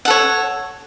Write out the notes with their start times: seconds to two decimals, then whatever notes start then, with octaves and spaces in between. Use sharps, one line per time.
0.05 F#5
0.08 A4
0.10 C#5